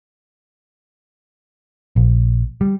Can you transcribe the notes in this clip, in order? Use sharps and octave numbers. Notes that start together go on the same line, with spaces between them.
A#1
G3